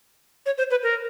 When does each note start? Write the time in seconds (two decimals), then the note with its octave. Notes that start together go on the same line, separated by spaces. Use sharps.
0.46 C#5
0.58 C5
0.71 B4
0.83 A#4